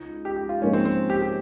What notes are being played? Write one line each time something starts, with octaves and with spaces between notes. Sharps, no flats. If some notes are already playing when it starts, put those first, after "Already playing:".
Already playing: C#2 D#4
G4
G4
F4
G#2 F3 A#3 C#4 D#4 A#4
C4
C4
G4
G4